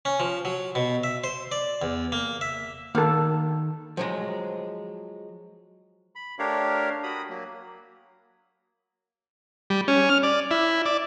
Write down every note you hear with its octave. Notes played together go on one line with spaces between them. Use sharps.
C#4
F3
F#3
B2
E5
C5
D5
E2
A#3
E5
D#3 A#3 A4
F3 F#3 G#3
B5
A3 D4 G4 A#4 C#5 F5
F#4 B5 D#6
F#3 A#3
G3
C#4
F6
D5
E4
D5